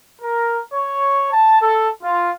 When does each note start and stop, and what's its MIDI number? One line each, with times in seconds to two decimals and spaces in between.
0.22 0.60 70
0.73 1.28 73
1.31 1.57 81
1.62 1.89 69
2.03 2.30 65